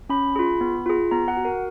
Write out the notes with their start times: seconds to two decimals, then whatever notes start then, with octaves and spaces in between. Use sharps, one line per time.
0.10 C#4 B5
0.36 F4 G#4
0.61 B3
0.86 F4 G#4
1.11 B3 A#5
1.28 F#5
1.37 F#4
1.45 A#4